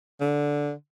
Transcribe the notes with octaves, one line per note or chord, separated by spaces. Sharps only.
D3